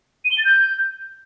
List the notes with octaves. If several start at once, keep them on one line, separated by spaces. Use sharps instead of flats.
D#7
G7
A6
G6